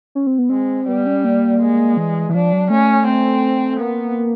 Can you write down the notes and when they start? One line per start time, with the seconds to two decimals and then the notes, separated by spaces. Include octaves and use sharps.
0.15 C#4
0.27 C4
0.38 B3
0.49 G#3 C4
0.88 G3 B3
1.06 C#4
1.25 A#3
1.60 G#3
1.97 E3
2.29 E3
2.34 F3 D4
2.52 F#3
2.70 A3 C#4
3.07 C4
3.80 A#3 B3